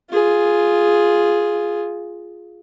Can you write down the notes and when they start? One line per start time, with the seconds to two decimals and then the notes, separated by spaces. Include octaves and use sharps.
0.11 F4 G#4